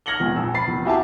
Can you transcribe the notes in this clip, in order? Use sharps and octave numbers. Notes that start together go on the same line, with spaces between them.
F6 G#6 A#6 C#7 F#7 G7
F1 G#3 F4
A#1 F2 E6
B5 A6 C7
F1
E4 F#4 G4 E5 G#5 A5